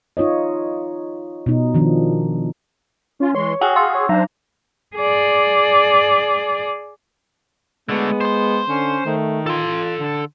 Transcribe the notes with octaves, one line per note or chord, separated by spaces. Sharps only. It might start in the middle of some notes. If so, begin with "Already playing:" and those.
D#4 F4 C#5 D#5
B2 D#4
D#3 F3 D4
C#4 F4
E3 G#3 C#5 C6
F#4 G#4 G5 G#5
F5 C6 E6
C#5
F#3 D4 C5 A#5
G#4 D5
D3 G#3 A3 B3
C5 C6
D3 C#4
D#3 A3
F4 A4 C6
D3